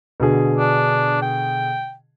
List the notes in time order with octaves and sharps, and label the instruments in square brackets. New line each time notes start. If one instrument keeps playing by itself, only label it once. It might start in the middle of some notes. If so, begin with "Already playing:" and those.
[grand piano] B2 D3 G#4
[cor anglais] D4
G5